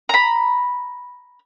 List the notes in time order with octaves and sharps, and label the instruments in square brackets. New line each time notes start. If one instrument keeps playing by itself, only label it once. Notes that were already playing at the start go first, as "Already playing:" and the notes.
[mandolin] A#5 B5